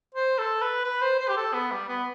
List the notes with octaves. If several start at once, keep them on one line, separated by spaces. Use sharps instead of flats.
C5
A4
B4
B4
C5
C5
G4
A4
B3
G3
B3